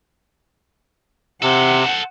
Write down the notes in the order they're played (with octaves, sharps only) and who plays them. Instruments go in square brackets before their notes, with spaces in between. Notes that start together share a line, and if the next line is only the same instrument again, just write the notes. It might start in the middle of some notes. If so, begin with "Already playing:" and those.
[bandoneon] C3 [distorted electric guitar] A4 C5 [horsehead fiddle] F#5